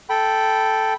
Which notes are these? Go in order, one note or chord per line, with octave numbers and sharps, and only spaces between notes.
A4 G5 B5